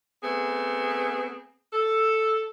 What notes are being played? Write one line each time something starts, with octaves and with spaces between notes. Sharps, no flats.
A3 B3 C4 G#4
A4